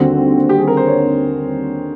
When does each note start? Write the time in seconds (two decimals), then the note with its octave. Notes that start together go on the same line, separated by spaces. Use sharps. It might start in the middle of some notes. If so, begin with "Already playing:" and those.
Already playing: D#2 D3 G3 C4 F#4
0.49 G4
0.58 G#4
0.67 A#4
0.77 C5
0.87 C#5